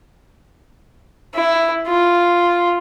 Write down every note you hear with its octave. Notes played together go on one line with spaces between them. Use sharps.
E4
F4